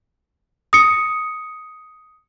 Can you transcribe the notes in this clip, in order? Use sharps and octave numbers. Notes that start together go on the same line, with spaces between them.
D#6 C#7